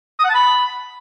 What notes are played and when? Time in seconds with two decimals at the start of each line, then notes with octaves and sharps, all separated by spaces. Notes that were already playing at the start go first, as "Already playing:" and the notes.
0.19 D#6
0.24 F#5
0.29 A5
0.35 B5